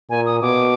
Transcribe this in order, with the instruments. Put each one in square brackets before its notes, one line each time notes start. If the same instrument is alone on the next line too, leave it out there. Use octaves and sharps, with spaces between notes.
[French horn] A#2 [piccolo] G#5
[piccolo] D#6
[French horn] B2 [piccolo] D6